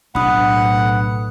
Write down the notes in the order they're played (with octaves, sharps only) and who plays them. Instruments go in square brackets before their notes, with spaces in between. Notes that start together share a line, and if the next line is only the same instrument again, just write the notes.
[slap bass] B1 D4 [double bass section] A2 A3 B3 [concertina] F#5 [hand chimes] B5 D#6